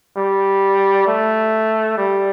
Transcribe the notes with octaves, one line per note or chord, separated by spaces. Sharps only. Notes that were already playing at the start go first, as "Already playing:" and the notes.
G3
A3
G3